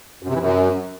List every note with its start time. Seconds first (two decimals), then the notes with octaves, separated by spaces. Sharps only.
0.23 F#2
0.28 C3
0.34 E3
0.40 F#2